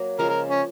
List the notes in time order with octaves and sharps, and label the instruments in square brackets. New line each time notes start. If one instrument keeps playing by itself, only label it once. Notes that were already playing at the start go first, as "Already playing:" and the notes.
Already playing: [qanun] F#3 A#3
[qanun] C#3 F3 G#3 [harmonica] A#4
[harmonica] A#4
C#4